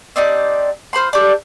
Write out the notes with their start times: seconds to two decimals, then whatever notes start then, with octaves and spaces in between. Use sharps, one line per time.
0.16 C4 D4 D#4 G4
0.93 F4 C5 B5 C6
1.13 D4 G4 A4